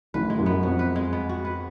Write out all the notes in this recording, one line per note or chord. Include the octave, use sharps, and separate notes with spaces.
A1 A2 B4
G#3
F#2
B3
F2 F#4
B4
G#3
B3
F#4
B4